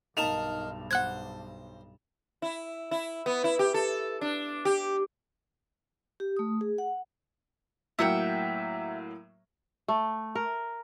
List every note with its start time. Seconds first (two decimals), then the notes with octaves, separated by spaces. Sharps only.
0.17 B1 G2 D#4 A#4 F5 A5 E7 F7
0.91 C5 F#5 F#6 G#6
2.42 E4
2.91 E4
3.26 B3
3.44 E4
3.59 G4
3.74 A4
4.21 D4
4.65 G4
6.20 G4
6.37 A3 D#6
6.61 G#4
6.78 F#5
7.99 A2 F#3 A#3 E5 F#5 G5
9.88 A3
10.35 A#4